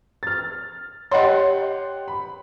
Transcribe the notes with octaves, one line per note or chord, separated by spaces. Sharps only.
F6 A6
G4 C#5 D#5 F#5 C6
B5